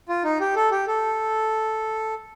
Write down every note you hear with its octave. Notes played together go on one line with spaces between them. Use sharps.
F4
D#4
G4
A4
G4
A4